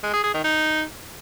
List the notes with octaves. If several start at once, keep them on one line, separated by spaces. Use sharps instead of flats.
G#3
G#4
G#4
D#3
D#4